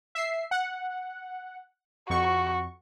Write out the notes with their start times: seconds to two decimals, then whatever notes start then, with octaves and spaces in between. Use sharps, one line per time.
0.15 E5 C7
0.51 F#5
2.10 F2 F#4 C#6